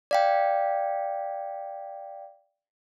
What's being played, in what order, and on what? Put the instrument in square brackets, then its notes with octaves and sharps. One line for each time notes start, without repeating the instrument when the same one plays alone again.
[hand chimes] D5 F5 G5